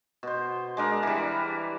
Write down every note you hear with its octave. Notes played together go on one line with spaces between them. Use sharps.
B2 C5
G#3 D4 A#4
E3 G3